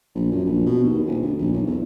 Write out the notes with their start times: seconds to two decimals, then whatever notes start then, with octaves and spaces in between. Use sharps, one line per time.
0.15 A#1
0.31 F#2
0.45 A#1
0.66 B2
0.83 D#2
1.07 D#1
1.22 D2
1.38 A#1
1.53 B1
1.67 E2